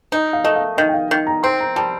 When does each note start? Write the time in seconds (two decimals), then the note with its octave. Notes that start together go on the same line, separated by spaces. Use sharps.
0.12 D#4 D#5
0.33 F5
0.44 A3 D#5
0.56 F5
0.78 D#3 D#5
0.89 G5
0.94 F5
1.11 D#3
1.27 A#5
1.43 C4 C6
1.60 A#5
1.76 G3 A5